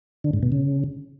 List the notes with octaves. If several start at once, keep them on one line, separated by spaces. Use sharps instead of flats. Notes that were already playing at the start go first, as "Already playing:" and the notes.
D3
G#2
B2
C#3